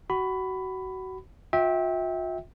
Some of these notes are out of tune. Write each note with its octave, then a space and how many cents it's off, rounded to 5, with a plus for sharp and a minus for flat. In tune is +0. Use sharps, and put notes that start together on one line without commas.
F#4 +25 B5 +15
F4 +45 E5 -25 G5 +0